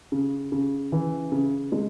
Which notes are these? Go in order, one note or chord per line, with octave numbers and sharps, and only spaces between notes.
C#3
C#3
E3
C#3
G#3